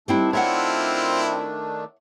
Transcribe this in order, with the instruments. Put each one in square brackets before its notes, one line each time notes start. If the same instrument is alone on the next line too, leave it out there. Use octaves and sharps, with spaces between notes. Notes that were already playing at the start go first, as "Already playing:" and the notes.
[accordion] D#3 A3 D4 [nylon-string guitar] G3 C4 E4
[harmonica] C4 E4 F4 [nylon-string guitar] C#5 E5 F#5